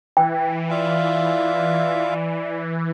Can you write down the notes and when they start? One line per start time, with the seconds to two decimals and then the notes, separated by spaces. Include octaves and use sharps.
0.17 E3 G5
0.70 F4 D5 E5 F5